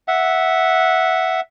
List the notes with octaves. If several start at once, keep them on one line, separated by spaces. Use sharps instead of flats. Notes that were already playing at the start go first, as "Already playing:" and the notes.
E5 F#5